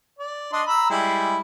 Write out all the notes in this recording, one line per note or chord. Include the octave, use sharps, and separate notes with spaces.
D5
D4 D#5 C6
A#5 B5 E6
G3 G#3 E4